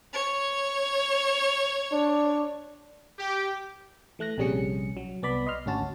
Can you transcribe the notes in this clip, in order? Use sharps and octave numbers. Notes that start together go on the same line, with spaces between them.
C#5
D4
G4
E3 A3 F#6 A#6
A#1 C3 G3 C#4 G#4 C#7
F#3
C2 B3 D5 B5
D#5 C6 F6
G#1 D2 C#4 F#4 A5